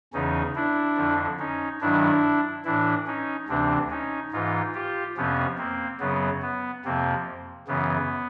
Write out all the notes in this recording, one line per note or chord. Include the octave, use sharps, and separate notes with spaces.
E2 C#3 E3 C#4 D#4
D4 E4
F2 D3 F3
C#4 D#4
G2 D#3 F#3 D4 E4
A2 E3 D4 E4
C#4 D#4
D2 C3 E3 C4 D4
C#4 D#4
G#2 E3 D#4 F4
F4 G4
F2 C3 F3 B3 C#4
A#3 C4
F#2 C#3 F#3 B3
B3
F2 C3 F3 A#3 C4
F#2 C#3 E3 B3